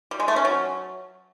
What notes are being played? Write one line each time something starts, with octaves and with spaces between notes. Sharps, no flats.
G3
G#3
A3
C#4
F#3